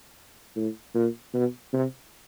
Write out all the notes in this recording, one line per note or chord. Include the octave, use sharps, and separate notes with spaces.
A2
A#2
B2
C3